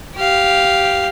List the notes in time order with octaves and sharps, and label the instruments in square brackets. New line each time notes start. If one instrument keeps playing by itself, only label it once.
[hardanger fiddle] G4 F5